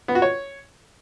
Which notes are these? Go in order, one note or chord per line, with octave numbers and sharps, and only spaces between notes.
B3
F#4
C#5